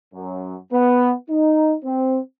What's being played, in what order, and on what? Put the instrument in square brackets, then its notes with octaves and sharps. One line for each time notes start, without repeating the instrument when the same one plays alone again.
[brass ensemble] F#2
B3
D#4
C4